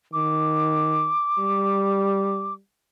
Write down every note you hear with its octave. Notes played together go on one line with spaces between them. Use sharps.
D#3 D6
G3